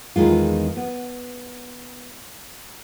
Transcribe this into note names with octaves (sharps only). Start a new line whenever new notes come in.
E2 D#3 G#3 F4
B3